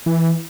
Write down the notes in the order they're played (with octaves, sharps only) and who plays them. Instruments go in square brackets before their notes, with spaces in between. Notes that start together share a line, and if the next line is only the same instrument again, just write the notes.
[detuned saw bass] E3